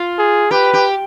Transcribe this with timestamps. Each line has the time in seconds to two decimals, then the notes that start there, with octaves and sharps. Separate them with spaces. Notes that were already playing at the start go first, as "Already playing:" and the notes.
Already playing: F4
0.18 G#4
0.51 G4 B4
0.73 G4